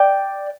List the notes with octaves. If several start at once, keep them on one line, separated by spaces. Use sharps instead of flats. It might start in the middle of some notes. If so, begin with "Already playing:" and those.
Already playing: D5 G5